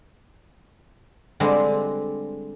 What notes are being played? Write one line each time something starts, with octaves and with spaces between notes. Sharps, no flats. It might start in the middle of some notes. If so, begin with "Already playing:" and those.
D3 G3 G#3 C4